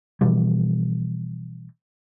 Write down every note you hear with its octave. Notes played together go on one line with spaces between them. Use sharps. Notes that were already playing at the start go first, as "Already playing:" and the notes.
B2 E3 F3 G3